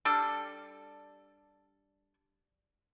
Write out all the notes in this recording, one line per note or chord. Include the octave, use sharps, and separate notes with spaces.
G3 D4 A4